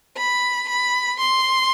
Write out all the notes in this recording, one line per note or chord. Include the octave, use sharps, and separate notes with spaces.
B5
B5
C6